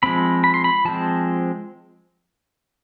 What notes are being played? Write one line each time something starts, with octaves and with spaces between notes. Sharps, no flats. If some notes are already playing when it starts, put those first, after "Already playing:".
F3 G#3 C4 B5
B5
C6
B5
F3 G#3 C4 A5